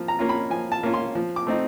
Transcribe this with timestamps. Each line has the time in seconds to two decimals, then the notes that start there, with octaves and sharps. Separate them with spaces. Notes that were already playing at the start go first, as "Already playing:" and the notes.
Already playing: F3 A#3 F4
0.08 A#5
0.19 A#3 C#4 F4
0.29 B5
0.50 F3 G#5
0.72 A5
0.83 A#3 C#4 F4
0.94 C6
1.15 F3
1.36 D6
1.47 A3 C4 D#4